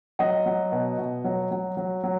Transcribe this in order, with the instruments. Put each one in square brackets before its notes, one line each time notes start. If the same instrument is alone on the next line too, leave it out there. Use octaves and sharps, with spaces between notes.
[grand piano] F#3 D#5 F#5
F#3
B2
B2
F#3
F#3
F#3
F#3